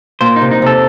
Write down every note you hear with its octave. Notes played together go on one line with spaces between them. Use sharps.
A#2 C5
D#4
C3
D#4
C3 A4